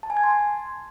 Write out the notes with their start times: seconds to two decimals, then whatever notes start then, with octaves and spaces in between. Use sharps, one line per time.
0.03 A5
0.10 G#5
0.17 G#6
0.24 C6
0.30 A5